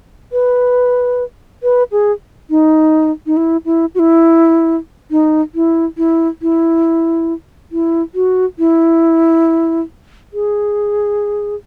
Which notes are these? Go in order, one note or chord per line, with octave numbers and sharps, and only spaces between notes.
B4
B4
G#4
D#4
D#4
E4
E4
F#4
E4
D#4
E4
E4
E4
E4
F#4
E4
G#4